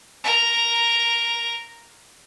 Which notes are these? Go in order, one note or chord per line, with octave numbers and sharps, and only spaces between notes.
A#4 A#5